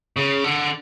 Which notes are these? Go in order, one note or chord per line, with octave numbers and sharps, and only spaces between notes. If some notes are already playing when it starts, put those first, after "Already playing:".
C#3
D3